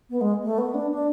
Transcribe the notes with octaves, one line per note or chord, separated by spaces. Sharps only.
B3
G#3
A3
B3
D4
D4